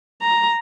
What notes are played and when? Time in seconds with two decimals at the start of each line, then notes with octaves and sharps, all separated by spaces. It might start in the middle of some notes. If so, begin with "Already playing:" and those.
0.22 A#5